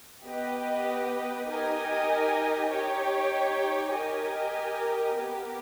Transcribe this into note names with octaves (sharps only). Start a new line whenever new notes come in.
B3 G4 B4 D#5
D#4 G4 A#4 D#5 G#5
D#4 G4 C#5 G5
G4 A#4 D#5 G#5
B3 G4 A#4